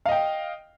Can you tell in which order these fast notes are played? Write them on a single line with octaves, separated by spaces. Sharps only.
F5 D#5 G5